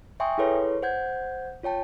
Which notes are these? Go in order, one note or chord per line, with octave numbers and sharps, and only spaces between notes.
E5 G5 G#5 C6 C#6 D#6
E4 G#4 A4 B4 C#5 C6
C5 F#5 G6 G#6
F4 C#5 G5 A5